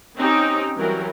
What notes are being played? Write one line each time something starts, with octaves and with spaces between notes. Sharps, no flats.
C4 C#4 D#4 G4
E3 F#3 G3 A#4